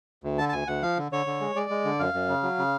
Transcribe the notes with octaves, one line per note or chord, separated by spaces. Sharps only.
D2
D3 A5
A5
D2 G#5
D2 F#5
F3 F5
D3
D3 C#5
D3
G#3
G#3 D5
G#3
D3
F#2 F5
F#2
C#3
F#3
C#3